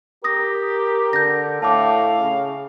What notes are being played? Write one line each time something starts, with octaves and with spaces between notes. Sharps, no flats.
G4 A#4 D#6 A#6
D3 G6 A#6
A2 F5 A5 D6
C#3